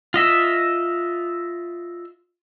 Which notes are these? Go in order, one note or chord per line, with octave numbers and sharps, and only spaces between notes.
F4 D#5 E5